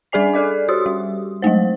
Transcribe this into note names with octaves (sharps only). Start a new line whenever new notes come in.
G3 D4 G#4 D5 G#5 C7
G#4 A4 D5 D6
F#4 G4 C6 D#6
G3
F#3 G#3 A3 C5